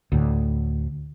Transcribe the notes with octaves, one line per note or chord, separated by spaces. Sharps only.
D2 A2